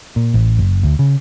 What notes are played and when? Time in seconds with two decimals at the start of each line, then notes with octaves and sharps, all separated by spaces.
0.16 A#2
0.34 A1
0.59 F#1
0.83 D2
0.99 C#3